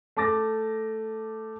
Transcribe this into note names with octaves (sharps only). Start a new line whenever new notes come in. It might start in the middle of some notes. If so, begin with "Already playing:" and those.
A3 A5 D6 A6 A#6